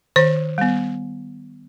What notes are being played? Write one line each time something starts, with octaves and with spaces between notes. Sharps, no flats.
D#3 C5
G3 B3